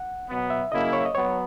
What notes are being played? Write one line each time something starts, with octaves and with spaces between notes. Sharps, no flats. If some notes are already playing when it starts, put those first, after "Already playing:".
Already playing: F#5
B2 F#3 B3
E5
C#3 F#3 A#3 E4 D#5
C#5
D#5
F#3 B3 C#5